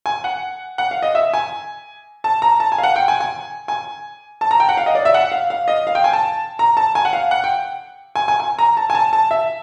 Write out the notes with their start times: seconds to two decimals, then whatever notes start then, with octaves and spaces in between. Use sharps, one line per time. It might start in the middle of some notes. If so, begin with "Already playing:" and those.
0.06 G#5
0.24 F#5
0.78 F#5
0.91 F5
1.02 D#5
1.15 E5
1.33 G#5
2.24 A5
2.42 A#5
2.60 A5
2.72 G#5
2.78 F5
2.83 F#5
2.96 G5
3.08 G#5
3.20 G#5
3.68 G#5
4.41 A5
4.51 A#5
4.60 G5
4.69 F#5
4.77 F5
4.86 D#5
4.95 D5
5.05 E5
5.14 F#5
5.32 F5
5.50 F5
5.68 D#5
5.87 F5
5.95 G5
6.04 G#5
6.13 A5
6.59 A#5
6.77 A5
6.95 G#5
7.05 F#5
7.13 F5
7.31 F#5
7.44 G5
8.15 G#5
8.28 G#5
8.40 G#5
8.59 A#5
8.77 A5
8.90 G#5
8.95 A5
9.13 A5
9.31 E5